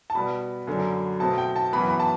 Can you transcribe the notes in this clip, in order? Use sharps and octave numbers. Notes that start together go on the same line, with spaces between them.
A5
B2 G3 B3 B5
F#2 D3 F#3
B2 A3 C4 A5
G5
A5
F#2 E3 B3 B5
B5
A5